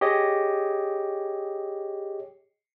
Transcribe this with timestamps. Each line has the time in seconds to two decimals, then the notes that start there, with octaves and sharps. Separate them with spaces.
0.01 G4 G#4 C#5 D#5